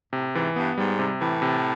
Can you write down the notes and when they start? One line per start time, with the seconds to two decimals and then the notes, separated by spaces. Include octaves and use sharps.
0.13 A2 C3
0.34 G#2 E3
0.56 G2 B3
0.78 G#2 G3
0.99 C3
1.21 A2 E3
1.42 C3